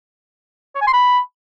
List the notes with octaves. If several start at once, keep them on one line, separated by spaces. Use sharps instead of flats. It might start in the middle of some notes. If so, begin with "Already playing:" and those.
C#5
G#5
C6
B5